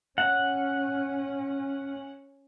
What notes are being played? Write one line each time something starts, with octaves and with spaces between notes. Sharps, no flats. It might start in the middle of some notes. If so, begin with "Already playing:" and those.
C#4 F#5